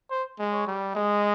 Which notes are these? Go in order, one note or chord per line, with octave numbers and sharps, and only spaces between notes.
C5
G#3
C#5
G3
G#3 D#5